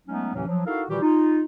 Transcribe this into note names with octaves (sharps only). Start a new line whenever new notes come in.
F#3 G#3 A3 B3 C#4 D#4
D#2 A2 C3 E3 F#3 C#4
F3 F#3
D#4 E4 F#4 A4 A#4 F5
A#2 D#3 E3 G3 F#4 G4
D#4 F4